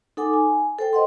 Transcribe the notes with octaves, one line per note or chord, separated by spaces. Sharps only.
D#4 A4 F#5 G#5 D6
G#5
A4 C5 G5
B4 D#5 F#5 C6